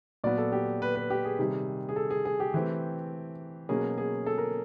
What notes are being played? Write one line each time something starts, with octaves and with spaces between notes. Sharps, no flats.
A#2 F#3 B3 D5
A4
G4
B4
B4
G4
G#4
C3 D#3 G3
G#4
A4
G#4
G#4
G4
E3 A3 C4
B2 F#3 A#3 C#4 G#4
G#4
A4
A#4